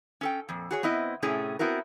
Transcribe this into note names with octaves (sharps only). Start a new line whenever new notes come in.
C#4 A4 G5
F2 A#2
F#4 G#4 C#5
B3 C4 E4 D#5
A2 C3 A3 C#4 G#4
B3 C4 E4 F#4 A#4